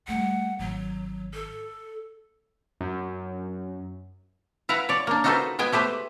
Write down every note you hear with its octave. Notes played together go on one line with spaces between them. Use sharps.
G3 A3 F#5
G#1 F#3
A4
F#2
E4 B4 F5 F#5 A#5
C#5 D5
A#3 D4
D#4 F4 F#4 A4 B4 C5
G#3 B3 G5 G#5
A3 G4 B4 C5